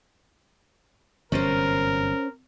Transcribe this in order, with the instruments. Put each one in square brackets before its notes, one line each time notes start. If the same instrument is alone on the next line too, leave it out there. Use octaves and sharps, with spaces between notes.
[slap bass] G1 F#2 C3 [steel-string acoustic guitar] C#4 C5 [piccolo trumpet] A#4